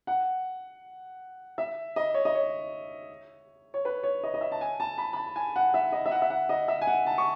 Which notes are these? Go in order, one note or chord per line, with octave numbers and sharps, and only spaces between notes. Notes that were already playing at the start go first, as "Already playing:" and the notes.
F#5
E5
D#5
C#5
D#5
C#5
C#5
B4
C#5
D#5
D#5
E5
A5
G#5
A5
B5
B5
A5
G#5
F#5
E5
D#5
E5
F#5
E5
F#5
D#5
E5
G#5
F#5
A5
C#6